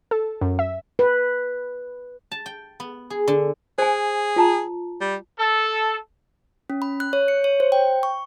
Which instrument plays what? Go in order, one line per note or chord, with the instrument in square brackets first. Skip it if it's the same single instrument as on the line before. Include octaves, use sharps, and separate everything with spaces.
[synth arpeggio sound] A4
F#2
E5
[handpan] B4
[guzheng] A5
G5
B3
G#4
D3
[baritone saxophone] G#4 [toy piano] C5 G#5
[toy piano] F4 A5 A#5
[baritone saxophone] G3
[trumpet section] A4
[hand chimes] C#4
B5
F#6
C#5
C#7
C#5
C5
G5
C#6